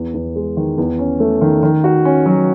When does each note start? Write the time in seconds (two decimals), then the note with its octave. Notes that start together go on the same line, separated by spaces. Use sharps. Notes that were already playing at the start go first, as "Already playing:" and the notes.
Already playing: E2
0.14 E2
0.36 G#3
0.57 D#3
0.78 E2
0.99 C#4
1.20 A3
1.41 D#3
1.63 D#3
1.84 F#4
2.05 C#4
2.26 F#3